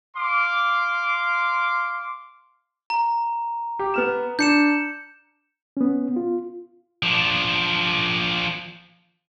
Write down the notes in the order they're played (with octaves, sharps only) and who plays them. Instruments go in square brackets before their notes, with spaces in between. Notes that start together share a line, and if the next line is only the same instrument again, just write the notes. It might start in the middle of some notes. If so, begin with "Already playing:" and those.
[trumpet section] F5 C6 D6
[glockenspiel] A#5
[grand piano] G4
B3 F6 E7
[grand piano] D4 [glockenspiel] G6 C#7 E7
[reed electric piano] B3 C#4
F4
[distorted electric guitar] F3 D4